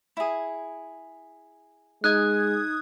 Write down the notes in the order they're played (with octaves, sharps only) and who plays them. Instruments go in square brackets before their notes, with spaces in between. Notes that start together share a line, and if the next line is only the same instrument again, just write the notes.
[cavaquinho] E4 G#4
[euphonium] G#3 [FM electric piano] D#4 D#6 G#6 [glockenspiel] F#6